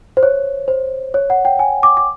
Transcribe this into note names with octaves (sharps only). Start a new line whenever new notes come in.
C5
C#5
C5
C#5
F#5
G5
G#5
D6
D6